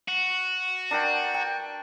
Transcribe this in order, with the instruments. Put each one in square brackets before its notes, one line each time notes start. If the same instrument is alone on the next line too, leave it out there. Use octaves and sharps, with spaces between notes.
[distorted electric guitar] F#4
[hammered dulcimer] D4 A#4 G5
G5